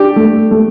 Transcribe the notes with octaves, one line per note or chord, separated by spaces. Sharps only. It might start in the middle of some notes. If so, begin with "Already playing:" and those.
Already playing: D4 G4
A3
A3